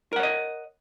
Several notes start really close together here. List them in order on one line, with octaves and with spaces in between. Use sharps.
A#4 F#5 C#5 D#5